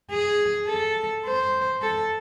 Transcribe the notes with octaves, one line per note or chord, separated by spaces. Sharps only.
G#4
A4
C5
A4